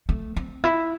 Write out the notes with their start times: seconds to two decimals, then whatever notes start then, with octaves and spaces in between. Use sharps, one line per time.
0.09 A3
0.36 C4
0.64 E4